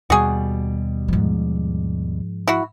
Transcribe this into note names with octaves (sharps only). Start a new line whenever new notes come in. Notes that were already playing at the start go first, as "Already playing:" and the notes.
D#2 B2 G3 F#4 G#4
G#2 F3
E4 F#4